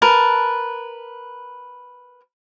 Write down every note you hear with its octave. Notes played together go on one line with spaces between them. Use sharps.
A#4 B4 A5